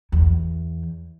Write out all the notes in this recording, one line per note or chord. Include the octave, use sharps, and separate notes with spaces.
E2